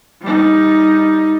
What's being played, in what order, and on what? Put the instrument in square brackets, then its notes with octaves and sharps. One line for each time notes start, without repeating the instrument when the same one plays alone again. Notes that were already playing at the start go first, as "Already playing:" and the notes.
[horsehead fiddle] G3 D#4